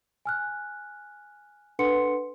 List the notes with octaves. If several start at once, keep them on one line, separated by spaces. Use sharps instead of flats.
G#5 F6 F#6
D4 A4 B4 F#5 C6 C#7